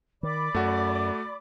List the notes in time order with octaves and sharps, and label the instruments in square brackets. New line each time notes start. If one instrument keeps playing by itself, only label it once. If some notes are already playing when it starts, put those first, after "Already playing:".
[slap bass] D#3 [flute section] D5 B5 D6
[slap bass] F#2 [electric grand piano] A3 F#4